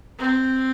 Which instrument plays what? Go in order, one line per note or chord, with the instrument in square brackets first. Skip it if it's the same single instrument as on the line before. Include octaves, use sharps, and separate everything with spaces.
[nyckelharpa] C4